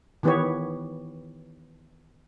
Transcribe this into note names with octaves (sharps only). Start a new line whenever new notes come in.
D#3 E3 B3 G4 B4 C#5